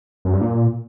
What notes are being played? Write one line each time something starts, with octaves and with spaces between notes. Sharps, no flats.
F#2
G2
A#2